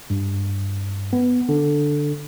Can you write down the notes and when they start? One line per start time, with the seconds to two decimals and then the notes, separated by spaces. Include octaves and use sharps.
0.10 G2
1.13 B3
1.49 D3